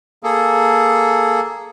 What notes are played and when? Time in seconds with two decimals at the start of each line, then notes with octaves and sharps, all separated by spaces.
0.23 A#3 G#4 A4